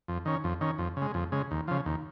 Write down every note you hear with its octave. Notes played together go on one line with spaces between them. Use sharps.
F2
D#3 C#4
F2
D#3 C#4
F2
C#3
G#3
F2
C#3 G#3
D#2
C#3 F3
D#2